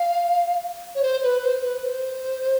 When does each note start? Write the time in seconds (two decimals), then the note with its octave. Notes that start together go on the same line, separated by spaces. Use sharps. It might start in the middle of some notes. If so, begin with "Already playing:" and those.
Already playing: F5
0.95 C#5
1.02 C5
1.23 B4
1.43 C5
1.62 B4
1.83 C5